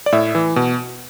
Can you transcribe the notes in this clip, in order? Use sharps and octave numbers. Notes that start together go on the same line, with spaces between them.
D5
A2 E5
E3
B2